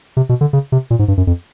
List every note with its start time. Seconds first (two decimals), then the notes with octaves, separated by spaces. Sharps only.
0.17 C3
0.29 B2
0.41 D3
0.53 C#3
0.72 C3
0.90 A#2
0.99 G#2
1.08 G2
1.17 F#2
1.27 F2